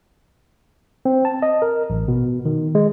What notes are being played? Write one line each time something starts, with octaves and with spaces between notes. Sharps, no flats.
C4
A5
D#5
A#4
A1
B2
D#3
G#3